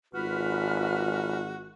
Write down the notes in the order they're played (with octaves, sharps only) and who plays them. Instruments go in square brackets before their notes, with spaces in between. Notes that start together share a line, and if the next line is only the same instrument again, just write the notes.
[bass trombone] G#1 [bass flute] F4 [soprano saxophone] F#4 [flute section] B4 F6